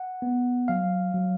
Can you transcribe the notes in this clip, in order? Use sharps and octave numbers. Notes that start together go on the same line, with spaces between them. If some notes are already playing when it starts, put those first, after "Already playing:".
Already playing: F#5
B3
F#3 F5
F#3